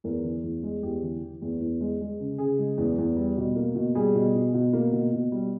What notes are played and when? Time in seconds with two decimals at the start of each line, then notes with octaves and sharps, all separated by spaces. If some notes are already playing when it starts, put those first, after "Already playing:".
0.04 E2 A#4
0.24 E3
0.43 E2
0.63 G#3
0.82 E2 G4
1.03 E3
1.21 E3
1.42 E2
1.61 E2
1.81 G#3
2.00 G#3
2.20 C#3
2.38 C#3 G#4
2.59 G#3
2.77 E2
2.98 E2
3.17 G3
3.37 B2
3.56 A#3
3.75 B2
3.95 G3 G#4
4.15 B2
4.34 B2
4.54 B2
4.73 A#3
4.92 B2
5.13 B2
5.32 G3